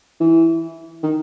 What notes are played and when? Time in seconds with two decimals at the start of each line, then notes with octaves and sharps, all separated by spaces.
0.20 E3
1.03 D#3